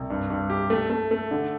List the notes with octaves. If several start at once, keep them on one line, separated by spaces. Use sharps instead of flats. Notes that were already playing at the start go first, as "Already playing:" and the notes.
Already playing: C2
G2
G2
G4
A3
A3
A3
D3